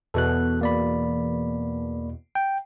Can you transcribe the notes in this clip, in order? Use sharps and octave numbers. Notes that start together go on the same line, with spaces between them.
E2 B2 A4 F#6
A#3 D5 B5
G5